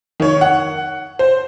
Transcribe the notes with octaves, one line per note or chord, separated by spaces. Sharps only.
D#3 C#5
F#5
C5